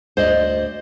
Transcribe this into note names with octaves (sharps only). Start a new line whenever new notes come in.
D2 C5 D5 D#5